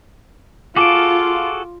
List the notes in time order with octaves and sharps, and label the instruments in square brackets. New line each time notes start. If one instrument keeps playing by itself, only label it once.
[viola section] F4 [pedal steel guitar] F#4 G#4 A4 [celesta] D6 D7